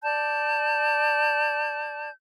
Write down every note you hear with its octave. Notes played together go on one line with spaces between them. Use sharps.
D5 A5 G6